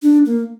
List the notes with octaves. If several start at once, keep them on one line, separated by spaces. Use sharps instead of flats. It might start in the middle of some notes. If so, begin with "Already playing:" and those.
D4
A#3